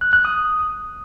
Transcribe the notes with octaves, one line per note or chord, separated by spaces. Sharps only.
F#6
F#6
D#6